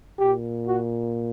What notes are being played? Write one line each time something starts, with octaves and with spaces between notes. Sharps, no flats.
A#2 G4
F#4